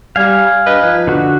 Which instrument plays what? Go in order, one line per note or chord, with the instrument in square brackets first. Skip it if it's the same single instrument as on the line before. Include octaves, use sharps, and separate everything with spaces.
[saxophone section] G3 [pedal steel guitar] F5 G#5
[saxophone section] G2 B4 D#5
F3 D#4 B4
[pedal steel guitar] D3 F#4